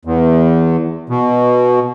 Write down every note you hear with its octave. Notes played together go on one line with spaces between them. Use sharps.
E2
B2